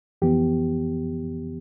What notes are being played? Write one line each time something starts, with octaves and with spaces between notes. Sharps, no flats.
F2 E3 B3 G4